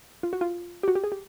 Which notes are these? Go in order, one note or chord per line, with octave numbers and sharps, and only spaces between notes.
F4
F#4
F4
G4
F#4
G4
G#4
G4